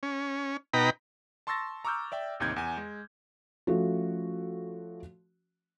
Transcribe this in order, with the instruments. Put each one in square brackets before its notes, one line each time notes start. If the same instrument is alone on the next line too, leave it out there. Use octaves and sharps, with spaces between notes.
[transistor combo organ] C#4
B2 D#4 G5 A#5 B5
[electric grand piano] A5 C6 C#6 E6 A6 A#6
A#5 C#6 D6 E6 F6 G6
D5 E5 G5
A1 D#2 C3 D#4 G6 G#6
E2 G#5
G#3
[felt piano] F3 A3 C#4 F#4